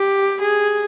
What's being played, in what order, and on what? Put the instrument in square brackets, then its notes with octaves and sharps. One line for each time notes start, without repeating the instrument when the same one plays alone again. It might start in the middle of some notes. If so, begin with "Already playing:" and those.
Already playing: [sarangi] G4
G#4